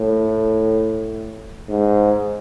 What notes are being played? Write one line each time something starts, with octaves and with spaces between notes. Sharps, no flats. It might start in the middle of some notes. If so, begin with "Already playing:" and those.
Already playing: A2
G#2